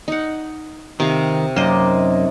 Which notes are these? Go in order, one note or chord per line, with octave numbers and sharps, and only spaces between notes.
D#4 F#5
C3 D#3 F5
F#2 C3 A#3 D#4 C5 D5 D#5